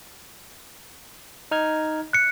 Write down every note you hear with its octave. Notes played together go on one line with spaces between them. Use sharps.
D#4 F6 G#6
F#6 C#7